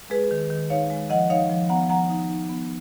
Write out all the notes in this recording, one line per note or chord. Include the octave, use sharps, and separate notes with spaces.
G#3 G#4 B4
D#3
D#3
D#4 C#5 F5
G#3
F3 D#5 F#5
D#4 C#5 F5
F3
B3 F#5 A#5
F3 F#5 A#5
D#4
D#4
B3